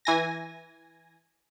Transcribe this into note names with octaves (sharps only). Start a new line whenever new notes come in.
E3 G#5 A#6